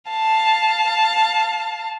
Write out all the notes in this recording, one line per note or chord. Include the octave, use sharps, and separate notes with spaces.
F5 A5